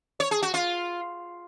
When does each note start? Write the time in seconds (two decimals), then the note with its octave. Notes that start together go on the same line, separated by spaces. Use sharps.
0.20 C#5
0.31 G#4
0.42 F#4
0.54 F4